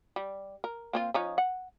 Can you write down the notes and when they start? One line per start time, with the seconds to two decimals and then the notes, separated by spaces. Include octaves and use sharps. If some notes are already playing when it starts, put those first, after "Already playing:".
0.16 G3
0.64 A#4
0.93 A#3 C4 F4
1.14 F3 C#4 D#4
1.38 F#5